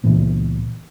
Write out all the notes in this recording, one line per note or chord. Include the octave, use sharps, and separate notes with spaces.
C#2 A#2 E3 B3